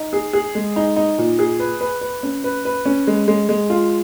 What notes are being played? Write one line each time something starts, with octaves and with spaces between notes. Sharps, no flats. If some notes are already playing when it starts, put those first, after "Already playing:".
Already playing: D#4
G#4
G#4
G#3
D#4
D#4
A#2
G#4
B4
B4
B4
C#4
B4
B4
C#4
G#3
G#3
G#3
F4